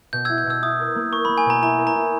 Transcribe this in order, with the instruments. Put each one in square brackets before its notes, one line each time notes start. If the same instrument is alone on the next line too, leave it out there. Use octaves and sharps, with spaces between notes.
[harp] B2 [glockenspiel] G6
[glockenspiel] E6 G#6
[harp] E4
[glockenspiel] G6
[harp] B2 [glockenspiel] E6
[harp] E4 [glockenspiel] D#6
[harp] A#4
A#3
[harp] A#4 [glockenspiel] C#6
[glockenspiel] B5
[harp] A#3
[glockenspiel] G#5
[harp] B2 [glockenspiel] A#5
[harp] E4 [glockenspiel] A#5
[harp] A#4
[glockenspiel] A#5
[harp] E4